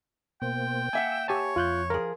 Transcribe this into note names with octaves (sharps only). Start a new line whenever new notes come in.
B2 A#3 C5 G5
A#3 E5 F#5 G#5 E6
G4 C#5 G#5 A5
F2 F4 F#6 G6
F3 G#4 A#4